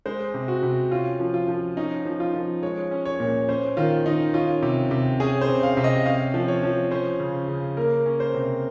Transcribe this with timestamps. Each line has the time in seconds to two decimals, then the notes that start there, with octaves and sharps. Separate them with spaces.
0.06 G#3 C5
0.34 C3
0.48 F#4
0.63 C3
0.91 C#4 F4
1.19 F3
1.34 F4
1.48 F3
1.77 C#4 D#4
2.05 F3
2.20 F4
2.34 F3
2.63 G#3 C#5
2.91 C#4
3.05 C#5
3.20 A#2
3.49 C#4 C5
3.77 D#3 F4
4.06 D#3 D#4
4.34 C#4 F4
4.62 C3
4.91 C3
5.20 C#4 G#4
5.41 C5
5.48 C3
5.63 F5
5.77 C3
5.84 D#5
6.06 C#4 F5
6.34 F3
6.48 C#5
6.63 F3
6.91 C#4 C5
7.20 C#3
7.48 C#3
7.77 A#3 A#4
8.06 C#4
8.20 C5
8.34 C3